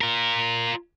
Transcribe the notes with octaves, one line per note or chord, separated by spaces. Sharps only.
F4 A#4